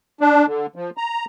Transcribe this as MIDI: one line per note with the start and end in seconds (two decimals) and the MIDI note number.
0.21 0.46 62
0.47 0.66 50
0.75 0.90 53
0.97 1.25 82